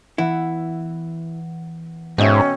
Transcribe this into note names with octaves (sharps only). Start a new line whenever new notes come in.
E3 B3 E4 F#5
G#2 B2 C#4 A4 D#5 E5 G5